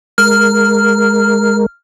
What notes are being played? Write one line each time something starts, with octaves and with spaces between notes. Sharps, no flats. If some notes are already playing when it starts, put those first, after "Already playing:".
G#3 A#4 F6